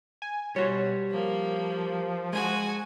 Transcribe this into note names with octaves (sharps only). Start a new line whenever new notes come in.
G#5
B2 G3 F#4 C5 C#5
F3 A#3
G#3 F#4 G#4 G#5